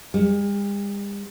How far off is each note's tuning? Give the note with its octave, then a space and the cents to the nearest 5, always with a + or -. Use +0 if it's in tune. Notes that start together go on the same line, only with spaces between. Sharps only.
G3 +45